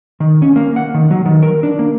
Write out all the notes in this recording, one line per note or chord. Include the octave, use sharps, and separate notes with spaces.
D#3
C#4
A#3
F#5
D#3
F#3
D#3
A#4
D4
A#3